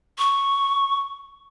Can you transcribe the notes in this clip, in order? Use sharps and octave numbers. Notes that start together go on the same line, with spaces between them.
C#6